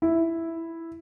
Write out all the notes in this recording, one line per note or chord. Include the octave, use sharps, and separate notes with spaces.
E4